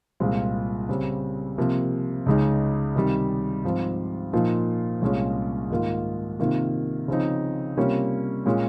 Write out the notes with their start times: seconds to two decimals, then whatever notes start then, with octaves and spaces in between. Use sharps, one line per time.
0.20 C2 A#2 G#3 C4 F4
0.89 C#3 G3 C4
1.58 C3 F3 A#3
2.26 C#2 C#3 G#3 D#4
2.95 C3 D#3 G3
3.64 G#2 F3 C4
4.33 A#2 F3 A#3 D#4
5.02 C2 A#2 G#3 C#4 F4
5.70 G#2 D#3 A#3 F4
6.40 C3 D#3 A#3 F4
7.08 C#3 F3 C4 D#4
7.77 C3 G3 A#3 C#4 F4
8.46 A#2 G#3 C#4 F4